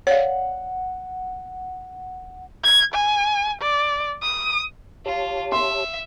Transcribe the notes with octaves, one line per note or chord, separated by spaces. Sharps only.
C#5 D5 F5 F#5
G#6
G#5
D5
D#6
F4 G4 C#5 A5
E5 C6